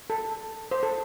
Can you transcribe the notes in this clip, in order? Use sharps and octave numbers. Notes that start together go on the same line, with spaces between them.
A4
C5
A4